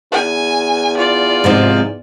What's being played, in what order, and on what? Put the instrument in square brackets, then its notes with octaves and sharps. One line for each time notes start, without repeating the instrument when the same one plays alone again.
[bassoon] E2 [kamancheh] G#5
[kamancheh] F4 D5
[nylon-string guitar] G#2 C3 F3